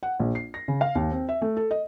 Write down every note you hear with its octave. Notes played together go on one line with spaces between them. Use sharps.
F#5
A#1
C7
A#6
C#3
F5
D#2
C4
E5
A3
A4
D#5